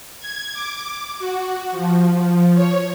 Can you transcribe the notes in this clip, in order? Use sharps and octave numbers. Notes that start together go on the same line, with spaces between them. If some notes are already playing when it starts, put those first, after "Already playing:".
G#6
D6
F#4
F3
F3
C#5